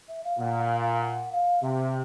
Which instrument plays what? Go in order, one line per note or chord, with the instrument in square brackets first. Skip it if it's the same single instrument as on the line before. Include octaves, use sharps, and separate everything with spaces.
[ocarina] E5
F5
[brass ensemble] A#2 [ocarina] F#5
[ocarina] F5
F5
F#5
F5
[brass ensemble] C3 [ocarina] E5